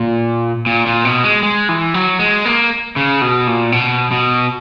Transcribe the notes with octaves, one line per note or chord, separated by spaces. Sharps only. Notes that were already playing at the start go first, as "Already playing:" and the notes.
Already playing: A#2
A#2
A#2
B2
G#3
G#3
E3
F#3
G#3
A#3
C#3
B2
A#2
B2
B2